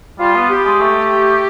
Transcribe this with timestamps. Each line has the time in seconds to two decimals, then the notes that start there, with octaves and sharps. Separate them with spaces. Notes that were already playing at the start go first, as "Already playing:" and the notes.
0.20 G3 F4
0.35 B3
0.50 G4
0.65 G#3
0.81 A3